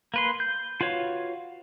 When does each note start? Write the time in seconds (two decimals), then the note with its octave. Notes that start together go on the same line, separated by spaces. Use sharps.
0.14 A#3 B4 C6
0.40 G6
0.81 F4 F#4 B4 C#5 F5